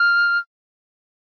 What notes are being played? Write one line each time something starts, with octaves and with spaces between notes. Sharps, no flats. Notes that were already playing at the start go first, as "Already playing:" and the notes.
Already playing: F6